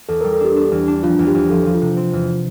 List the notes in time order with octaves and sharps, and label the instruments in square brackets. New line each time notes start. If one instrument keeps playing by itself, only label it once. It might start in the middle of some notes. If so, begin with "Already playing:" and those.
[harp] E2 [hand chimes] A4
[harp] G3 [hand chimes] A#4
[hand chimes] A4
[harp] D4 [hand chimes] G4
[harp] D4
E2
D4
[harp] F3 [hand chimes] F4
[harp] E2
[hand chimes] G4
[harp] E2
[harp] F3 [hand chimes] A4
[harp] F3
[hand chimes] F4
[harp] C3
C4
E2